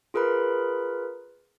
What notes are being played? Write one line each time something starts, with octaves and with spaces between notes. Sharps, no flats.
F4 G#4 A#4 B4 B5